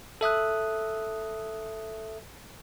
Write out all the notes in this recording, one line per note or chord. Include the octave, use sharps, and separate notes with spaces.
A4 E5 D#6 F#6